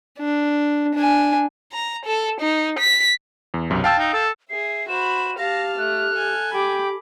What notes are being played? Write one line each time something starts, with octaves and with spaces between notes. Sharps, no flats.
D4
D4 G#5
A#5
A4
D#4
B6
E2
B1 F#2 C3
F5 G5 A5 E6
D#4
A4
G#4 E5 C7
F#4 C5 B5 E7
G4 F5 A5 F6 A#6
A3 F#6
A4 G#5
G4 G5 B5 D6